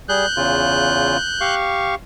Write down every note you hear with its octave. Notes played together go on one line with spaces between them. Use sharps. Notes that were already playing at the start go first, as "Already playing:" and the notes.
G3 G#4 F#6 G6
E2 C#3 F4
G4 F5 C#6